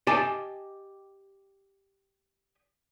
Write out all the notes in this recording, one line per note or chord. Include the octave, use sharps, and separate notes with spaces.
G4 D#5 G#5 A5